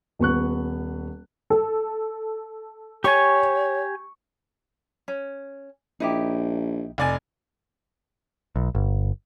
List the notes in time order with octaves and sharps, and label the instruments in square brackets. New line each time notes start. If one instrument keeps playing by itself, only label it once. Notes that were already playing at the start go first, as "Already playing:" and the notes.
[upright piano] D#1 B3 C#6 F#6
[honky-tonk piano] A4
[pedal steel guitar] G4 G#5 [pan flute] C#5 [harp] C#6
[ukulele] C#4
[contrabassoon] A#1 [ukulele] D#4 E4 G4
[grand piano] F1 D5 G#5
[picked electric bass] B1
G1